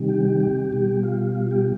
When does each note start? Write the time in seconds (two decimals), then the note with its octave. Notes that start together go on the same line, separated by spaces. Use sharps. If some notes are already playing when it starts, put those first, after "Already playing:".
Already playing: C3 D#3 G3
0.09 G4
0.25 G4
0.40 G4
0.72 B2 G3
1.03 F4
1.35 F4
1.51 G4